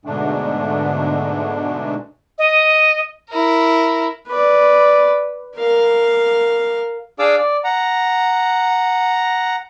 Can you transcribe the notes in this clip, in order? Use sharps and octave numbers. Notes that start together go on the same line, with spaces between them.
G#2 B2 D3 G#3 A3 D4
D#5
E4 A#4
B4 D5
A#4 F5
D4 G#4 D5 F5 D6 E6
D5
F#5 A#5